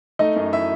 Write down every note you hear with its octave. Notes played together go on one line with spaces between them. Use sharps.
A3 D#4 D#5
F#2
E4 E5